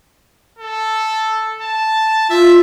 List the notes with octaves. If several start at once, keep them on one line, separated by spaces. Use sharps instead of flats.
A4
A5
F4 E5